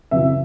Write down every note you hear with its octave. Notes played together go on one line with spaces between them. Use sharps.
F#2 C#3 E3 E5